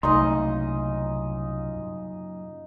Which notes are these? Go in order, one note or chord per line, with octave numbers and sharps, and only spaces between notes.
C2 F#2 A#2 C#3 A3 D#4 D#5 C6